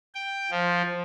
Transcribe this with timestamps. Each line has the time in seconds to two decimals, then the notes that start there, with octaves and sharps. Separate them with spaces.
0.15 G5
0.51 F3